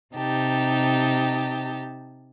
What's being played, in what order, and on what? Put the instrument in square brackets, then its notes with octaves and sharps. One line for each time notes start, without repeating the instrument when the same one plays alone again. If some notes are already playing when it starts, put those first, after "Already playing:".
[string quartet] C3 D#4 G4 A5